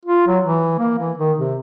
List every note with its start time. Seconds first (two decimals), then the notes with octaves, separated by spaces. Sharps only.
0.05 F4
0.27 F#3
0.44 E3
0.79 A#3
0.99 E3
1.17 D#3
1.37 C3